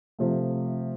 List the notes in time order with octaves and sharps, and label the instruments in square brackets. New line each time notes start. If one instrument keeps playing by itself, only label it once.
[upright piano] C3 F3 A3